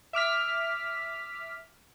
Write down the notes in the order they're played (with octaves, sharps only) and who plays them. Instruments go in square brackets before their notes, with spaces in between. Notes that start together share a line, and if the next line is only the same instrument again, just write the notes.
[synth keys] E5 D6 F6 B6